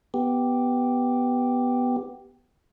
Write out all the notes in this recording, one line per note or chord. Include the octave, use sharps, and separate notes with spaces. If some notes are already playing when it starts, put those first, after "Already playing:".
B3 G4